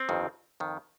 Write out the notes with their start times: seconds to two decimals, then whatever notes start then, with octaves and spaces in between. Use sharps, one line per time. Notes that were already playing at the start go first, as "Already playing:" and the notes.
Already playing: C4
0.09 G1 F2 D#3
0.60 F2 D#3